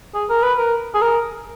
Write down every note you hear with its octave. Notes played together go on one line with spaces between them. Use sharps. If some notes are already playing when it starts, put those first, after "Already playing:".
G#4
A#4
B4
A#4
G#4
A#4